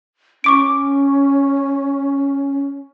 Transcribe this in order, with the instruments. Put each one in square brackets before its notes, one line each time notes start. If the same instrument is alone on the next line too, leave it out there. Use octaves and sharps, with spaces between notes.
[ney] C#4 [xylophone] C#6 D6 D7